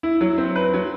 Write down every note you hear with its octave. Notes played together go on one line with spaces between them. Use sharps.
E4
F#3
C4
B4
F#3